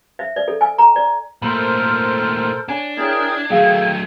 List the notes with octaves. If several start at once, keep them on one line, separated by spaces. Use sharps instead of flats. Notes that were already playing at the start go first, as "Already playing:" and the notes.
E5
D5
A4
G#5
A#5
D5
A#2 A3 A4 A#4 C5 B5 F6
D4 C#5 G#5 A5
E4 G#4 A#4 C#5 G5 G#6
D#3 F#3 A3 G#4 A4 F5 G5